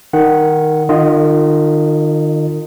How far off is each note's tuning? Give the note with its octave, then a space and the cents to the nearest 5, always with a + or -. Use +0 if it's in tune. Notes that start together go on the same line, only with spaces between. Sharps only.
D#3 +0 F#5 +0
D#3 -40 F4 -5 D#5 +0